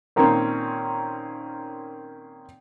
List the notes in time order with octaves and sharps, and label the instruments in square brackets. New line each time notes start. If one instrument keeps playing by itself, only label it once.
[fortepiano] A#2 D#3 A#3 C4 C#4 C#6